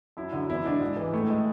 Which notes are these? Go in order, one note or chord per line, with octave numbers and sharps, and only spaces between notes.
F#2 E4
D3 F#3
E2 E4
D3 G#3 D4
G#2
E3 G#3
A2 A3
G#3